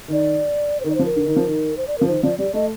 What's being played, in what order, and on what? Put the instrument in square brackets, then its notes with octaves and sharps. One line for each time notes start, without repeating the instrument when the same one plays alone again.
[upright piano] D#3 [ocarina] D5
[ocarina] C5
[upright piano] D#3 [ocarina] A#4
[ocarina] D5
[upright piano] F3 [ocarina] C5
[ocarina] A#4
[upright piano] D3
D#3
F3
D#3
[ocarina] C5
D5
[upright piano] F3 [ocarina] A#4
[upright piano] D#3 [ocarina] C5
[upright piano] F3 [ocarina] D5
[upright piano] G3 [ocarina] D5
[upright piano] A3 [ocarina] D#5